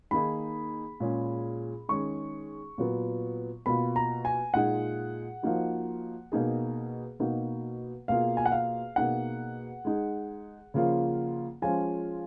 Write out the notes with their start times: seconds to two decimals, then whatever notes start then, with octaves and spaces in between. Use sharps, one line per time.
0.11 D#3 A#3 D#4 G#4 B5
1.00 A#2 G#3 C#4 G#4
1.89 D#3 G#3 C#4 G#4 C#6
2.78 A#2 F#3 B3
3.66 B2 A#3 F4 B5
3.96 A#5
4.25 G#5
4.54 A#2 G#3 D#4 G#4 F#5
5.43 F3 A#3 D#4 F#4
6.32 B2 A#3 D#4 G#4
7.20 B2 A#3 D#4 F#4
8.08 B2 A#3 F4 G#4 F5
8.37 G#5
8.46 F#5
8.52 F5
8.96 B2 A#3 D#4 G#4 F#5
9.85 G#3 D#4 G#4
10.74 C#3 F3 A#3 C#4 F4
11.62 F3 G#3 C#4 F4 G#5